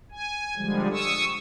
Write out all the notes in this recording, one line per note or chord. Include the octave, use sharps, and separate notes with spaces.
G#5
D3 F3 G3 G#3
C#6 D#6 E6